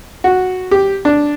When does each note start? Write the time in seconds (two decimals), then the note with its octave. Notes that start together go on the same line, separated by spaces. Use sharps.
0.24 F#4
0.71 G4
1.05 D4